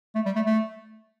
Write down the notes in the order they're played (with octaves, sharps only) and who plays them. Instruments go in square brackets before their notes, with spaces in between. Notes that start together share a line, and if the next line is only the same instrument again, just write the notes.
[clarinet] A3
G3
A3
A3